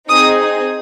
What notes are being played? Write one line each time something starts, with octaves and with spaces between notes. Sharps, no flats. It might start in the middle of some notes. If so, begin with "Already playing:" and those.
C4 D#4 G#4 D#6